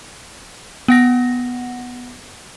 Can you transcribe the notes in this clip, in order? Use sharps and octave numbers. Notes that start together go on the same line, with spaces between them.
B3 F#5 A#6